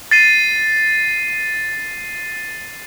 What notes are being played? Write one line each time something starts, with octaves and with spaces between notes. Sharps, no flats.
A6 C7 D#7